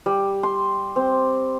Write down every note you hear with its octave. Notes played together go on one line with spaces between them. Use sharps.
G3
C6
C4